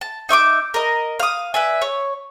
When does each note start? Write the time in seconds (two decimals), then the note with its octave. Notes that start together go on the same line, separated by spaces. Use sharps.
0.01 A5
0.29 D#4 E5 C#6 D6
0.74 A#4 D#5
1.20 F5 D#6
1.54 B4 D5 E5 G#5
1.82 C#5